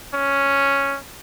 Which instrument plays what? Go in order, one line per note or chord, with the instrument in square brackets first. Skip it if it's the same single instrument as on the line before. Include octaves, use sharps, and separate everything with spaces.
[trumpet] C#4